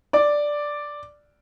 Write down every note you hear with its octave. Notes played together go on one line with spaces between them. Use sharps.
D5 D6